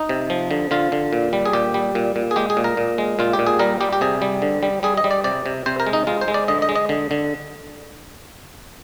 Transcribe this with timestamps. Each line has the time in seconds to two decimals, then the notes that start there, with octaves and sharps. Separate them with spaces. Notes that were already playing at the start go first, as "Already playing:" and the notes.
Already playing: D#4
0.09 C3
0.30 F3
0.51 D3
0.71 D3 F4
0.92 D3
1.13 A#2
1.33 G3
1.45 G#4
1.53 A#2 G4
1.74 G3
1.95 A#2
2.16 A#2
2.31 G#4
2.36 G#3 G4
2.50 G#4
2.57 A#2
2.64 A#4
2.77 A#2
2.98 G#3
3.19 A#2 F4
3.33 G4
3.39 A#2
3.47 G#4
3.59 G3 A#4
3.81 G3 G4
3.93 G4
4.01 C3 G#4
4.22 G3
4.42 D3
4.63 G3
4.83 G3 G#4
4.97 D#5
5.04 G3
5.11 D5
5.24 C3 D5
5.46 C3
5.66 C3 C5
5.80 A#4
5.87 G#3
5.93 D#4
6.07 G#3 F4
6.21 C5
6.28 G#3
6.34 D5
6.48 D3 D#5
6.62 D#5
6.69 G#3
6.75 D#5
6.89 D3
7.11 D3